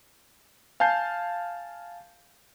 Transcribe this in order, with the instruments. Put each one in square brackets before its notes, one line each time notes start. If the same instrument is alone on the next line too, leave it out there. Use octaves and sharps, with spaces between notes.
[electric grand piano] F5 G#5 A5 G6 C7